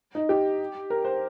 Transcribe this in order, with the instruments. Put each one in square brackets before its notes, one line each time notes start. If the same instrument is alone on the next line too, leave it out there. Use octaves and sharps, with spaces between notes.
[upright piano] D#4
G4
A#4
C5